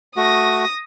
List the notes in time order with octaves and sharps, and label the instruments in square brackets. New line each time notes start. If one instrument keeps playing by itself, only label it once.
[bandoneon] A3 F#4 [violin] D#6 A#6